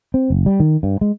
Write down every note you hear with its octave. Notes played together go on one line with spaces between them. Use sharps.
C4
F#1
G3
D#3
G2
G#3